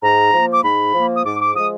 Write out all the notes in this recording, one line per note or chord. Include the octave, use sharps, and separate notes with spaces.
G#2 A#5
F3 A#3
D6
G#2 B5
F3 A#3
D#6
G#2 D6
D6
F3 G#3 D#6